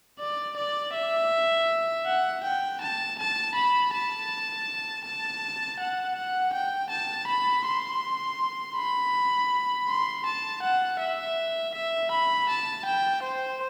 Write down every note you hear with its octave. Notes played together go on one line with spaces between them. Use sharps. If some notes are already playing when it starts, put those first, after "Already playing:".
D5
D5
E5
F#5
G5
A5
A5
B5
A5
A5
F#5
F#5
G5
A5
B5
C6
B5
C6
A5
F#5
E5
E5
B5
A5
G5
C5